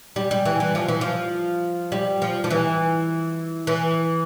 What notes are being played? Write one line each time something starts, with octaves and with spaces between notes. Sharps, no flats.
G3
G3
E3
E3
F3
E3
F3
G3
F3
F3
E3
E3